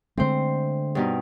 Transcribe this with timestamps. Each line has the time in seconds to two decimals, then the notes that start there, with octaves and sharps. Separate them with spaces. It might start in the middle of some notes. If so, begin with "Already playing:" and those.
0.17 D3 G#3 A3 C4 C5
0.95 G2 B2 D#4